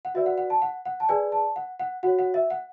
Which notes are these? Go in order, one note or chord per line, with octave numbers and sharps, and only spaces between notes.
F#5
F#4 B4 D5 E5
F#5
F#5
A5
F#5
F#5
A5
G#4 B4 D5 G#5
A5
F#5
F#5
F#4 C#5 F#5
F#5
E5
F#5